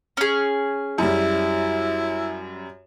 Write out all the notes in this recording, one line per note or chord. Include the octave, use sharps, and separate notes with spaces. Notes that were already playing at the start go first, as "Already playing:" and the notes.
C#4 G#4
F#2 G3 E4